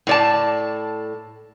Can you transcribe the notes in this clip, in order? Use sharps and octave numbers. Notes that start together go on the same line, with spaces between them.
A2 D5 A5